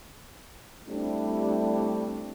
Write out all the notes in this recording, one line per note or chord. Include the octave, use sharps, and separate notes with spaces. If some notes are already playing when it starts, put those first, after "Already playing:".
G3 A3 C4 D4 E4 G4